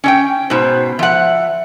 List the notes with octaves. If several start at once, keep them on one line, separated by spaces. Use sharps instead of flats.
C#4 D4 G5
G#2 B2 C5
F3 E5 F#5